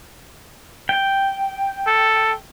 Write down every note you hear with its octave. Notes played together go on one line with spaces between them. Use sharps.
G5
A4